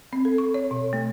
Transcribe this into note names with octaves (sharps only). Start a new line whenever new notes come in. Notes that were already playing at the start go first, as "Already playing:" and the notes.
C4
A4
C#6
C#5
B2
A3